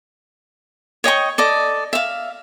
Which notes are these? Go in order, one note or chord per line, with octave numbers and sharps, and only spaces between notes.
C#5 D#5 G5 C#6
A4 D5 D#5
E5 F5